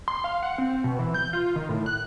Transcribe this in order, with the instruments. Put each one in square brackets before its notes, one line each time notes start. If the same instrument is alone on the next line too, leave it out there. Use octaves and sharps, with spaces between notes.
[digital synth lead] C6
F5
F#5
C4
B2
E3
G6
F4
D#3
A2
F#6